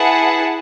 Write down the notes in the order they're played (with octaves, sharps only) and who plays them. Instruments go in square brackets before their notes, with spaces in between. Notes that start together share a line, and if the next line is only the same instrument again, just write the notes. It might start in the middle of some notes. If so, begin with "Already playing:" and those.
Already playing: [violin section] E4 G#4 B4 F#5 A5